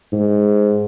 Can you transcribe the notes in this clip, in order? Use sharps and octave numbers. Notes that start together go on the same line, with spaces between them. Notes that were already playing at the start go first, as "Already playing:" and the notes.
G#2